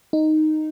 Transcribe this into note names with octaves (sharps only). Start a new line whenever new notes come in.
D#4